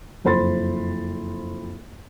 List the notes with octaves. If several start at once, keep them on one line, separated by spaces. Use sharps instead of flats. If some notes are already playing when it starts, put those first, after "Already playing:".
F#1 F2 C5 B5 C6 A6